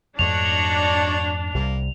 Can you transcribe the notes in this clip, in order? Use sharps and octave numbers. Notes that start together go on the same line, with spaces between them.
F2 G#2 A3 D4 D#4 F#4 C#5 F7
C2 C3 G3 A#3